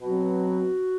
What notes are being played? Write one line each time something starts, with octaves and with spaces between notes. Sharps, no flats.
B2 F#3 C4 F#4